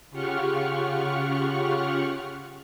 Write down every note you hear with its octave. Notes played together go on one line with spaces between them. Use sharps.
C#3 F4 G4 F#5 C#6 F6